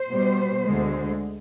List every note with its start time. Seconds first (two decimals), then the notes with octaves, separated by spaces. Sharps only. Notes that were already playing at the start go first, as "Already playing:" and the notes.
Already playing: C5
0.10 B2 G3
0.65 D2 D3 G#3